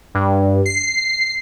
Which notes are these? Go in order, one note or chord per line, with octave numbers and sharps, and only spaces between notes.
G2
C7